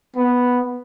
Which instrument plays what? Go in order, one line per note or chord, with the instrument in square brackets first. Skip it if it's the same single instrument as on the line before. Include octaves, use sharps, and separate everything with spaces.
[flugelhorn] B3